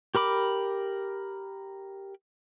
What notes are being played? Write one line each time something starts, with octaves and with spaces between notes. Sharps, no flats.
G4 A#4 B5 D6